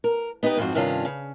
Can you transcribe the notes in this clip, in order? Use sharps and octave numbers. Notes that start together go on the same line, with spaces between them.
A#4
B3 D#4 G4 B4
F2 G#2 F3 C4 F#4
G2 C3 D#3 C#4 D4 F4
C#3